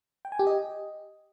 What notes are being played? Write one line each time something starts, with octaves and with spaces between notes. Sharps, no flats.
G5
G#5
G4
D#5